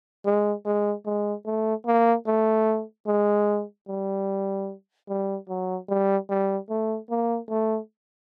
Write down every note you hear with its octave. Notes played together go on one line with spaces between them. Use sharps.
G#3
G#3
G#3
A3
A#3
A3
G#3
G3
G3
F#3
G3
G3
A3
A#3
A3